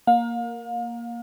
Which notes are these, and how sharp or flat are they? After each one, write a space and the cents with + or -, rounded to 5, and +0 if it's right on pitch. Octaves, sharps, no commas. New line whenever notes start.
A#3 +0 F5 +35